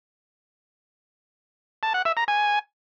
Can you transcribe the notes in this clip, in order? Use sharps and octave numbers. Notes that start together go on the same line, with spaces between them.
A5
F#5
E5
A#5
G#5